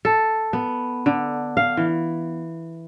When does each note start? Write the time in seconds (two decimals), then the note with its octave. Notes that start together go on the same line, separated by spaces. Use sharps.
0.05 A4
0.53 B3
1.06 D3
1.57 F5
1.77 E3